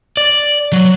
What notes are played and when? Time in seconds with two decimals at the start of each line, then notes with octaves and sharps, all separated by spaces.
0.17 D5
0.73 F#3